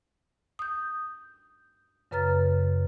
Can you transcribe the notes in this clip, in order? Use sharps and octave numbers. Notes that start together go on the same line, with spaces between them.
D#6 G6
F#2 C#3 B4 A#5 F6 A6